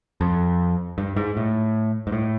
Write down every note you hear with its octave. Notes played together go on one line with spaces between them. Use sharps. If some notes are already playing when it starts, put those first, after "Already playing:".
F2
G2
G#2
A2
G#2
A2